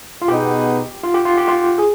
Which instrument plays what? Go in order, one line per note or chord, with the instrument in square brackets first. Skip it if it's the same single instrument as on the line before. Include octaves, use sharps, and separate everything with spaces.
[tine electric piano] F4
[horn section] B2 B3 D#4 G#4 B4 [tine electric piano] G4
[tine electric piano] F4
G4
F4
G4
F4
G#4